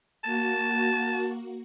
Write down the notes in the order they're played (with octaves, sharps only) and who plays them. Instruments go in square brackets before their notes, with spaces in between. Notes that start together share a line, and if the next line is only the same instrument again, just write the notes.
[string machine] A#3 F#4 [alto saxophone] A5